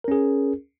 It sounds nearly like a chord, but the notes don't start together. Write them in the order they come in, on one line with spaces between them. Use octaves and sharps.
A#4 C#4 G#4